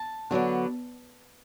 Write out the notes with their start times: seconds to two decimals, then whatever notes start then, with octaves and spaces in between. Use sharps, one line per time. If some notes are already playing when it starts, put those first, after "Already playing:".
Already playing: A5
0.31 D3 F#3 B3 D4